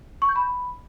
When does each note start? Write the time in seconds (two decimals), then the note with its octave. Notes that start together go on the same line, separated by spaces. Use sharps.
0.22 C#6
0.29 G6
0.36 B5